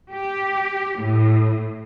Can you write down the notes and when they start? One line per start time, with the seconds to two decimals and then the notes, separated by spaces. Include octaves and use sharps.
0.12 G4
1.00 A2